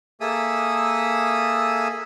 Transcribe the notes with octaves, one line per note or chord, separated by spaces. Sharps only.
A#3 G#4 A4 E5 D#6 E6